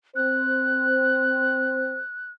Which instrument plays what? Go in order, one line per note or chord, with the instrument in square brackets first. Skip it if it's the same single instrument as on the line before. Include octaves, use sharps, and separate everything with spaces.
[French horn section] C4 C5 [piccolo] F#6